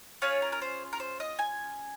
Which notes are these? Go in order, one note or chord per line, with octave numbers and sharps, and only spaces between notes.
C#4 F4 G#4 C#5
A#4
A#4
C5
A#4
C5
D#5
G#5